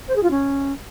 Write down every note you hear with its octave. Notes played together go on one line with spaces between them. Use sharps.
C5
G#4
F4
C#4